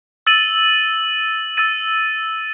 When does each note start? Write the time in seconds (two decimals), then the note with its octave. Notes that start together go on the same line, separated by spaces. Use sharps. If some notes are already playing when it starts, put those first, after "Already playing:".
0.27 E6 A6 D#7 F#7
1.57 E6 A6 D#7